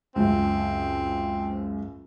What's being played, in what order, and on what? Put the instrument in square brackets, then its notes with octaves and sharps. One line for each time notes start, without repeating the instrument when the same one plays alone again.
[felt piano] C#2 F#2 [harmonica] C4